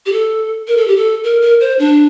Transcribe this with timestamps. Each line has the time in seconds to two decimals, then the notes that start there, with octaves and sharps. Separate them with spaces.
0.06 G4
0.12 A4
0.68 A#4
0.77 A4
0.88 G4
0.97 A4
1.24 A#4
1.41 A#4
1.60 C5
1.79 D4